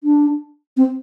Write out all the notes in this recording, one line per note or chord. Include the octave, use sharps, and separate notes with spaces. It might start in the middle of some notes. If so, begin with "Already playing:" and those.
D4
C4